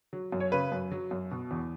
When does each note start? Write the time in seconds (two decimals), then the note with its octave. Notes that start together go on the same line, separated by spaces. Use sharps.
0.13 F#3
0.32 F#2
0.40 C#5
0.52 C#3 B4
0.72 F#2
0.91 F#3
1.11 F#2
1.31 B2
1.51 E2